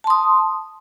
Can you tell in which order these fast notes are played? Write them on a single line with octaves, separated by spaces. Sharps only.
A5 C6 D#6